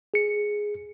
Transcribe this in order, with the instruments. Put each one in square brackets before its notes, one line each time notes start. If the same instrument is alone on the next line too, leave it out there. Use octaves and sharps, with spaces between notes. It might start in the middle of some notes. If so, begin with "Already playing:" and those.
[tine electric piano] G#4 C#7